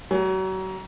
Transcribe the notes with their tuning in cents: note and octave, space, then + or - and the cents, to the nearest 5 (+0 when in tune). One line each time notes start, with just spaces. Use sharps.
F#3 +35 G#5 +0